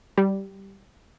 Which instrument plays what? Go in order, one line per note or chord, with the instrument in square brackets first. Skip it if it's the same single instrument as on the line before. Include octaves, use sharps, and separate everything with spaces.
[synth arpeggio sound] G3